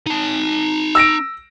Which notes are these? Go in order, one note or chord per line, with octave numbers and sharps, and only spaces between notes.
D#4 A5
E6 A#6 D7